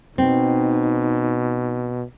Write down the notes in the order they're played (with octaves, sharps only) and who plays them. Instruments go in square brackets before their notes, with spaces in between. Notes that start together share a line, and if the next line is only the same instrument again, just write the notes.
[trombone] B2 [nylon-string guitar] C4 [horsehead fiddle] D#4